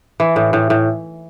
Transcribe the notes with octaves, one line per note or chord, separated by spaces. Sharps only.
E3
A2
A2
A2